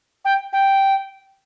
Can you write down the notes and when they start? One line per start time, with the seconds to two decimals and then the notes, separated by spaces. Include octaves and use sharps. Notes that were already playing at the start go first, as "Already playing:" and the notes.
0.25 G5
0.53 G5